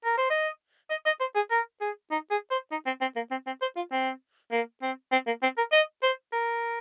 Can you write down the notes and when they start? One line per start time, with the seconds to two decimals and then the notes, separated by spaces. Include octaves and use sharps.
0.04 A#4
0.17 C5
0.30 D#5
0.90 D#5
1.06 D#5
1.20 C5
1.35 G#4
1.51 A#4
1.81 G#4
2.11 D#4
2.31 G#4
2.51 C5
2.71 D#4
2.86 C4
3.01 C4
3.16 A#3
3.31 C4
3.46 C4
3.61 C5
3.76 F4
3.91 C4
4.51 A#3
4.82 C4
5.12 C4
5.27 A#3
5.42 C4
5.57 A#4
5.72 D#5
6.02 C5
6.33 A#4